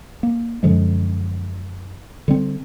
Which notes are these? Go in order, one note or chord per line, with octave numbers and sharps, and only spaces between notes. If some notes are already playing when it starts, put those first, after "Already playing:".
A#3
F#2 D3 F3 G#3
D3 G3 C4